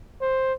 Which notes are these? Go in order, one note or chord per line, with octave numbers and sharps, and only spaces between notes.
C5